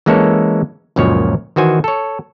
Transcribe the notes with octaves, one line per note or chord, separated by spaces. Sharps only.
E3 G#3 A#3 C#4 A4 C#5
C#2 F#2 A#2 F3 C#5
D#3 E3 F#4 C5 G#5
A4 C#5